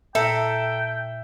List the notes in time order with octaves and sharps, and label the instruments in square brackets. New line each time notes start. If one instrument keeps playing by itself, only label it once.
[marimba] A#2 [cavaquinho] A4 A#5 [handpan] E5 [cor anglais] G5